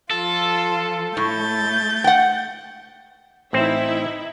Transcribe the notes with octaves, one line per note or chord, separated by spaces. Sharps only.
F3 F4 A4
A2 A3 G6 A6
F#5 G5
A1 C4 D#4 E4 C5 E5